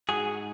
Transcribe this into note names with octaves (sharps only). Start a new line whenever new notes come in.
G#2 F#4 G#4